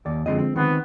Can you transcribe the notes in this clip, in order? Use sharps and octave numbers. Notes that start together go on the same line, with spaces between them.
D#2 D5
F#2 D3 F3 G#3 C4 D#5
C4
D#3 B3 C4